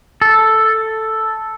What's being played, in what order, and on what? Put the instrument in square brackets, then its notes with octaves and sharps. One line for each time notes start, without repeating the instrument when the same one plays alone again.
[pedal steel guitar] A4